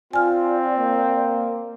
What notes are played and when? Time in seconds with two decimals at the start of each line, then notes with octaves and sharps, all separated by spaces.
0.13 C4 F4 D5 G#5 F6
0.78 A#3